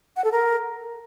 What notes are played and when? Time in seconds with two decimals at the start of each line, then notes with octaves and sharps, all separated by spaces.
0.16 F#5
0.24 A4
0.32 A#4